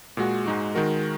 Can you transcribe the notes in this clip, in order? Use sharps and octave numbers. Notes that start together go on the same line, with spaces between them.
A#2 G#3 F#4
G#2 G#3 D#4 F#4
D#3 G#3 F#4 A#4